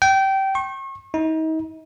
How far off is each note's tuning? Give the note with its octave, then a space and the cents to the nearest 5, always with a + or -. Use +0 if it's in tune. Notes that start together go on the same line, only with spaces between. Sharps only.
G5 -20
C#6 -40
D#4 +35